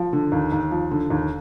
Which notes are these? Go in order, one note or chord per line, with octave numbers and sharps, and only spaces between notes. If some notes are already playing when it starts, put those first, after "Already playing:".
Already playing: F3
D3
D#2
D#2
F3
D3
D#2